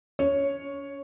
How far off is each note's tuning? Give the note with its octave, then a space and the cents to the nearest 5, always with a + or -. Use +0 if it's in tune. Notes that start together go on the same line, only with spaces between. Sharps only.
C#4 +35 C#5 +0